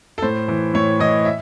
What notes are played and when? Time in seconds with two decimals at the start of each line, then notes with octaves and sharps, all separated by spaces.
0.18 A4
0.22 A2 C5
0.48 E3
0.74 A2 C#5
0.99 E3 D#5
1.25 E5